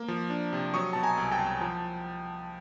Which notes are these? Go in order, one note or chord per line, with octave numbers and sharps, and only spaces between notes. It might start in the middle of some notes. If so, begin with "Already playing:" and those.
Already playing: A#3
F3
D4
C3
F#3 C#6 D#6
B2 A5
G#5 A#5
C2
G5 A5
C2
F3